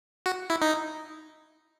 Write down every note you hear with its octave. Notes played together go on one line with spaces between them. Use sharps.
F#4
E4
D#4